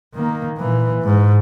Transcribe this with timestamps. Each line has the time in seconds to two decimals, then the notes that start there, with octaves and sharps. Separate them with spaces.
0.15 D#3 A#3
0.58 A#2 E3
1.03 G#2